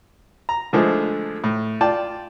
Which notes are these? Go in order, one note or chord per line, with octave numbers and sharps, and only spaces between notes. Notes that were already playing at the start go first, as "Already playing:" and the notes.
A#5
D3 F3 G#3 A3
A2
F4 D5 G5 A5